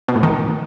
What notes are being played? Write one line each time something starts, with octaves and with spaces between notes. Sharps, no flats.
B2
A2
D#3